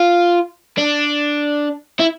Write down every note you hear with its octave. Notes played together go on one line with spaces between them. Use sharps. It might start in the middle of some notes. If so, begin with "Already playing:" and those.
Already playing: F4
D4
E4